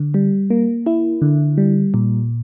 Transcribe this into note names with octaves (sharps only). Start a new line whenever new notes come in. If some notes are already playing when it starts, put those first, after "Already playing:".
Already playing: D3
G3
A#3
E4
D3
G3
A#2